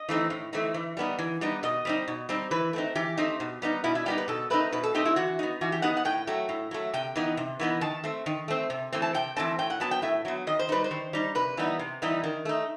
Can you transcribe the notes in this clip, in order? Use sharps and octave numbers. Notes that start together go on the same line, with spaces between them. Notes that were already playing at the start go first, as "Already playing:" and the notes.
Already playing: D#5
E3 A3 C4 D#4
A2
E3 A3 C4 D#4
E3
G3 B3 D#4
E3
G3 B3 D#4
B2 D#5
G3 C4 D#4
B2
G3 C4 D#4
E3 B4
A3 C4 D#4
E3 G4
A3 C4 D#4
B2
G3 B3 D#4
B2 E4
E4
G3 B3 D#4 G4
B4
B2 A4
A3 C4 D#4 B4
B2 B4
A4
A3 C4 D#4 G4
E4
E3 F#4
B3 D#4
E3 F#4
G4
B3 D#4 F#5
F#5
A2 G5
F#3 A3
A2
F#3 A3
C3 G5
E3 B3 D#4
C3
E3 B3 D#4
D#3 A5
A3 C4
D#3
A3 C4
C3
E3 A3 C4
A5
C3 G5
E3 A3 C4 A5
A2 G5
F#5
F#3 B3 A5
G5
A2 E5
F#3 B3
D#3 D#5
C5
G3 D#4 B4
C5
D#3
G3 D#4
C3 B4
E3 G3 B3 D#4
C3
E3 G3 B3 D#4
D#3
A3 D#4